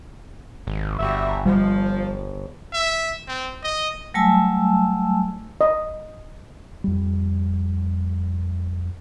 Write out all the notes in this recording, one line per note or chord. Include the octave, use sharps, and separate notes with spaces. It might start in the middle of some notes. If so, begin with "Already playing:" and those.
G#1
G1 G3 F#4 E5
F3 G3
E5
C4
D#5
F#3 G3 A3 G#5 A5 E6
D#5
F2 G3